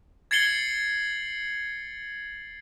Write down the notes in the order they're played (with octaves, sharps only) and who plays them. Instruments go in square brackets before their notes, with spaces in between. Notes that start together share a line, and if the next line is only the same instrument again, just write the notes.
[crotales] G#6 A6 C7 C#7 F#7 G7